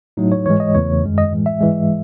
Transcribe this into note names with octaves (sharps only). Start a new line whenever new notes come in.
A2 F#3 A3 D#4
C#5
G#2 E3 G#3 C#5
D#5
E2 C#3 E3 A3 C#5
F#2 D#3 G#3
D#5
A2 E3 G#3
E5
G#2 E3 G#3